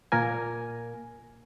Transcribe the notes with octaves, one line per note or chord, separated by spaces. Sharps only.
A#2 A#3 A#4 G#5